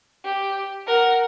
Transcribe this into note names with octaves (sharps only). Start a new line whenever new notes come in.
G4
A#4 F#5